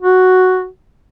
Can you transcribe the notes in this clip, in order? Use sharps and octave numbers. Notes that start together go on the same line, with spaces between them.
F#4